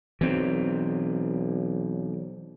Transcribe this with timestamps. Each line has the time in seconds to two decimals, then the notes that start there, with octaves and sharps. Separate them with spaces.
0.21 B1 E3 C4